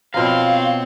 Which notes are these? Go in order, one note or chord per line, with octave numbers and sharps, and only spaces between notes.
B2 F3 C4 A#4 C#5 F5